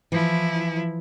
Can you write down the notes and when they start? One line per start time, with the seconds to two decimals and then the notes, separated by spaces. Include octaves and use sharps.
0.12 E3 F3 E4